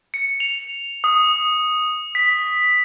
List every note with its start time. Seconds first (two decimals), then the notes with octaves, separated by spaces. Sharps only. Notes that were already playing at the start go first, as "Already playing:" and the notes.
0.14 C#7
0.40 F7
1.04 D#6
2.15 B6